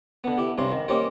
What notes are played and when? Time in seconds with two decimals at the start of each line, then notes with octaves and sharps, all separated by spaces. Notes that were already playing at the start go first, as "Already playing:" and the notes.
0.24 D3 B3
0.38 E4 G4
0.58 G2 C3 C#4 C6
0.72 D#3
0.88 A#3 C#4 D#4 G4 C5 C#5